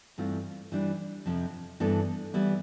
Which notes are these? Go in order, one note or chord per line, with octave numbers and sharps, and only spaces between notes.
G2 E3 A3 C4 F4
E3 G3 D4
F2 C3 F3
G2 E3 B3 D4 A4
E3 G3 B3 E4